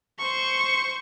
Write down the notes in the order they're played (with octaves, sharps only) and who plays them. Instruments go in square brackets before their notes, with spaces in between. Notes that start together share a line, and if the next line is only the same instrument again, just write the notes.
[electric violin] C5 C#6